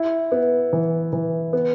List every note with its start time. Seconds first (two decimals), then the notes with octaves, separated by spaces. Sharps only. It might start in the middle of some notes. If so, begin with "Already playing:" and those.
Already playing: E4
0.32 B3
0.73 E3
1.13 E3
1.53 B3